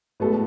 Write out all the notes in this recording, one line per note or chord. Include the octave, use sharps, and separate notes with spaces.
A2 G#3 B3 F#4 A4